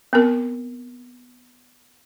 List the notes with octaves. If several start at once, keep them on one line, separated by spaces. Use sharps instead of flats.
B3 C4 A#4